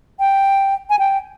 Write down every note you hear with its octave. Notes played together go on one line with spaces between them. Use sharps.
G5
G#5
G5